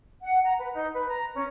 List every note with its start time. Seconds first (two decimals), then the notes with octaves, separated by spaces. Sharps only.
0.22 F#5
0.45 A#5
0.59 B4
0.73 D#4
0.94 B4
1.10 A#5
1.35 C#4